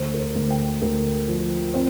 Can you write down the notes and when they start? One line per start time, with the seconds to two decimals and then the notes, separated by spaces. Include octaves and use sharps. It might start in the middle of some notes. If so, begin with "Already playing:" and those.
Already playing: D2 C5
0.14 A#4
0.20 C5
0.36 D2
0.50 G5
0.82 D2 A#4
1.28 F3
1.74 C4 C5